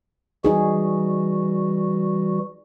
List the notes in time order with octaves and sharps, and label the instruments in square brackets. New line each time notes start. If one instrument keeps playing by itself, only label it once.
[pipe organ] E3 G3 F#4 [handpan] D#4 G#4